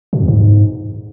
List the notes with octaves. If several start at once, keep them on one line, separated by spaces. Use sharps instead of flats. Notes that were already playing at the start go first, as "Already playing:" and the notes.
A#2
E2
G#2